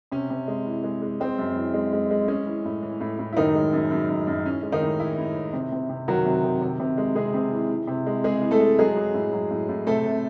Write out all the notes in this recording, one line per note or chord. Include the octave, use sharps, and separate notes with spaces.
C3 C#4
C3
G#3
E3
G#3
G#3
G#3 C4
F#2
E3
G#3
G#3
G#3
G#3 C#4
E3
A2
E3
A2
A2
E4
F#2 D#3 D#4
G#3
F#2
F#2
F#2
F#2
E3 C#4
G#3
D#3 D#4
A2
E3 E4
A2
E3
C3
C3
C3
D#3 F#3 F#4
C3
D#3
C3
C3
G#3
C3 G#3 G#4
C3
E3
E3
C3
G#3
C3 G#3 G#4
E3
A3 A4
G#3
F#3 G#3 G#4
F#3
A2
F#3
A2
A2
C3 A3 A4
C3